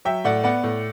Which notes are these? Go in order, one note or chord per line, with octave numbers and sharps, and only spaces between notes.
F#3 E5 G5
A2 D5 F#5
B3 D5 F#5
A2